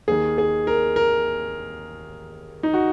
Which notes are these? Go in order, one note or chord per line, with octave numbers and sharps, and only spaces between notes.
D#2 D#3 G#4
G#4
A#4
A#4
D#4
F#4